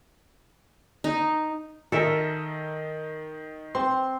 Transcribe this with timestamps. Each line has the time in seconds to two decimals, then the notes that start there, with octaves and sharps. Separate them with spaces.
1.04 D#4
1.92 D#3 A4 A#4 D#5 E5
3.75 C4 C6